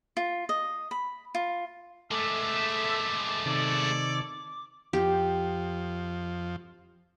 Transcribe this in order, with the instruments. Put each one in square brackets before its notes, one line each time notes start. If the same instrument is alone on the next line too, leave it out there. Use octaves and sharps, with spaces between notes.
[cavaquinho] F4
D#5
B5
F4
[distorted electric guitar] G#3 A3 [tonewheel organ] A4 [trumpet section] E5 [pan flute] D6
[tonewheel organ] C3 D#3 [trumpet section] A4 C#5 D5
[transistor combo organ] F2 F3 [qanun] G4